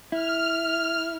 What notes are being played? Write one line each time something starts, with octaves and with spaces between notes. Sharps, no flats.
E4 F6